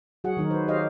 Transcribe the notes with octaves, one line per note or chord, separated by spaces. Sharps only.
F#3 F#4 G#4 F#5
D#3 F#3 D#4 F#4 A#4
B4 C5
G4 G#4 C5 C#5 D#5 F5